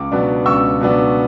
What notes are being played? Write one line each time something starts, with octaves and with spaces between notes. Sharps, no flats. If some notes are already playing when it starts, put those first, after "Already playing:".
Already playing: C#2 D6
B2 F#3 B3 D4
C#2 C#6 E6
B2 F#3 B3 D4